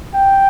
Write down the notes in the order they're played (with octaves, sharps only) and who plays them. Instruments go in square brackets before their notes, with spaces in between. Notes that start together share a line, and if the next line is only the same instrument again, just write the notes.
[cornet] G5